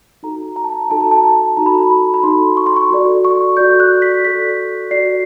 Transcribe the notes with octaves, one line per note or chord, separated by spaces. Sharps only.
D#4 F#4 A4 A#5
A#5
A5
A#5
D#4 F#4 A4 A5
A#5
A5
A#5
D#4 F#4 A4 A#5
B5
A#5
B5
B5
D#4 F#4 A4 C6
C#6
C6
C#6
F#4 A4 D5
C#6
F#4 A4 D5 G6
F#6
B6
F#4 A4 D5 B6
F#4 A4 D5 C7